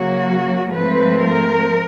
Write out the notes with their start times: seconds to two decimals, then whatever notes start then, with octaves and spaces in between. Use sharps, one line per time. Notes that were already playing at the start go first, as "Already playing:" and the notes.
Already playing: C#3 F#3 A#3 F#4
0.72 G#2 F3 A3 C4 B4
1.22 A#4